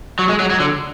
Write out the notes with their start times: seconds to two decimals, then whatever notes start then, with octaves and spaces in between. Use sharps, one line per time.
0.19 F#3
0.29 G#3
0.40 F#3
0.51 F#3
0.60 D3